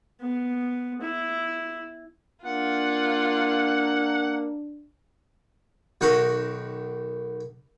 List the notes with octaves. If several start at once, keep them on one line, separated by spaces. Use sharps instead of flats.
B3
E4
A#3 D4 F4 F#5
B1 D#3 F#4 D#5 F#5